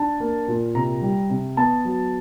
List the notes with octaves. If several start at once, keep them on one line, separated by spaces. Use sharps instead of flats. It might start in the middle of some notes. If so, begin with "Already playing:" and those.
Already playing: D4 A5
A#3
A#2
C3 A#5
G3
C3
B3 A5
F#3